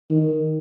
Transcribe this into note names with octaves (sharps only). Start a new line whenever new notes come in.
D#3